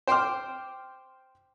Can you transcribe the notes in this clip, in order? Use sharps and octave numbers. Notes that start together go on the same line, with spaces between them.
C5 G5 C6 D6 F6